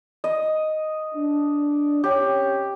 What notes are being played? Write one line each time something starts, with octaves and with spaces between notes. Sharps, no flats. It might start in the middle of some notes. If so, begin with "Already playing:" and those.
D#5
D4
C3 C#4 G4 C#5